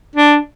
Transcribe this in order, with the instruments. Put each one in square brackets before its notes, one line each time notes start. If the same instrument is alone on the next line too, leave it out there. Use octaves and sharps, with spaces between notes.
[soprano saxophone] D4